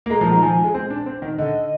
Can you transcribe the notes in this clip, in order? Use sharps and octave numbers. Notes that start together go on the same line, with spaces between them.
A#3
G#3 A#5
F3
D#3
F3 G#5
G#3
C4
D4
C4
D#3
D3 D#5